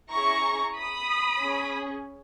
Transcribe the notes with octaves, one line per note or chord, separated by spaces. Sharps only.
C#4 E4 G#4 A#5 C#6
B5 D#6
C#4 G#4